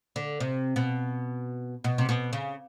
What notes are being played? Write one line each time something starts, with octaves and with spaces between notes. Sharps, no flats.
D3
C3
B2
B2
C3
B2
C#3